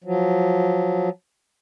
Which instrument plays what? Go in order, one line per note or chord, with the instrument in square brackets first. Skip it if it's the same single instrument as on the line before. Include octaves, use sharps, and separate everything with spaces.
[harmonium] F3 F#3